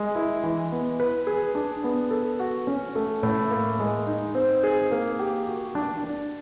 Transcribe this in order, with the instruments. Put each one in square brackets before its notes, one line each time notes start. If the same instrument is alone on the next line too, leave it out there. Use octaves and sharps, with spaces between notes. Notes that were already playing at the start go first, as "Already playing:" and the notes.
Already playing: [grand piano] G#3
E4
E3
B3
B4
G#4
D4
B3
A4
F#4
C#4
A3
A2
A#3
G#3
D#4
C4
G#4
A#3
G4
F#4
D4
D4